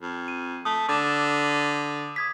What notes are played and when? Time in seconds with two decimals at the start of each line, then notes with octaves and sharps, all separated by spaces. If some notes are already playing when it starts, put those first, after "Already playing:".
0.02 F2
0.28 D#7
0.65 A3 D#6
0.89 D3 D6 E7
2.16 D#6 G#6 B6